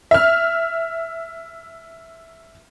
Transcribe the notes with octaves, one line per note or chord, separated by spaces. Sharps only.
E5 F6